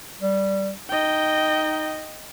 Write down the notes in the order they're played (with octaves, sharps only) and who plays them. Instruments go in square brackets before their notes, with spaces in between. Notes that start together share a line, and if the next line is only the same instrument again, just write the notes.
[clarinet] G3
[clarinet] D#4 [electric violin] D#5 G5